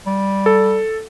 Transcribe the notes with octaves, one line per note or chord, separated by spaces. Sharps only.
G3
A4